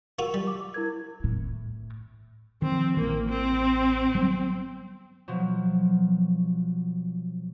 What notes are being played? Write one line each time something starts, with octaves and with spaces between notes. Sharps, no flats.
A#3 F4 F#4 C#6 E6
G3
D6
E4 A#4 G#6
A2
D#3 F3 C4
A1 E3 A#3
C4
F#3 G3 B3
B2 F3 F#3